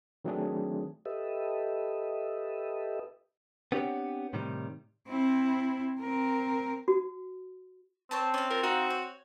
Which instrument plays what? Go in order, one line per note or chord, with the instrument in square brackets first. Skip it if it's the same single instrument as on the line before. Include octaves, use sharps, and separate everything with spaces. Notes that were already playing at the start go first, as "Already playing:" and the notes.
[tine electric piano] D#3 F#3 A3 C4 D4 G#4
[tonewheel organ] G4 A4 B4 D#5 E5
[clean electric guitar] B3 C4 D4 G4 C#5 F#5
A2 C3 D#3 G3
[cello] C4 E4
C4 A#4
[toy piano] F#4
[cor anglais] C4 [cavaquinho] C5 C#5 A5
[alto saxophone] C#4 [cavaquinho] D5 F5
[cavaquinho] F4 [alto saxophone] A#4
[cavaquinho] D#4 F5 D#6 [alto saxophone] F#4
[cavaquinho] C#5